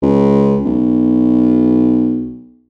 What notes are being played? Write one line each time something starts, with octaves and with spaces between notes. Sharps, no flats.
C#2
B1